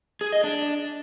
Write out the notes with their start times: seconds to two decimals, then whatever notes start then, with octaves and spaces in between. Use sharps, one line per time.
0.21 G#4
0.32 D#5
0.44 D4